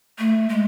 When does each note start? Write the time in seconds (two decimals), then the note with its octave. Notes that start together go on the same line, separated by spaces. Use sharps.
0.18 A3
0.49 G#3